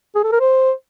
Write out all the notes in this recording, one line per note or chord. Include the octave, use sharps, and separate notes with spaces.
G#4
A4
A#4
C5